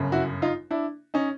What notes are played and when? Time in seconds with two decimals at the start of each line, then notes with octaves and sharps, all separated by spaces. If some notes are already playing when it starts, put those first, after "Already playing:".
Already playing: G1 F#2 C#3
0.12 E4 F#4
0.42 D#4 F4
0.71 D4 E4
1.14 C#4 D#4